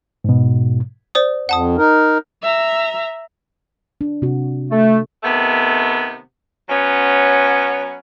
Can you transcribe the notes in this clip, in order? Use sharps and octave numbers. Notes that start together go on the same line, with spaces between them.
G#2 B2
C5 D5 D#6
F2 F#5 A5 D#6
D#4 A#4
E5 A#5
D4
C3 F#4
A3
C3 D#3 A3 B3
F#3 B3 C#4